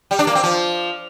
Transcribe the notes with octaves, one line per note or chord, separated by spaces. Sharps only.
G3
D4
A#3
C4
F3